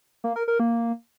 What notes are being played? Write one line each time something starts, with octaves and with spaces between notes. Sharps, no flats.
A#3
A#4
A#4
A#3